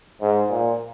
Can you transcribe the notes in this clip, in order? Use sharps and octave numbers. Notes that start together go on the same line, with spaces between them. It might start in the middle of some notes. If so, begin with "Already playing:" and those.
G#2
A#2